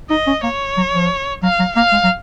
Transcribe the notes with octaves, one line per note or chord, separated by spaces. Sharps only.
D#4 D#5
C#4
A#3 C#5
F#3
F3
F#3 F5
F#3
A#3 F5
G#3
F#3